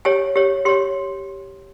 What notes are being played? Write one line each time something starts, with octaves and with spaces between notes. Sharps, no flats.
G4 C#5 G#5
G4 C#5
G4 C#5 C6